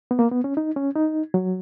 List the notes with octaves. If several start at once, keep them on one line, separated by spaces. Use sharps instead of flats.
B3
A#3
B3
C#4
D#4
C#4
D#4
F#3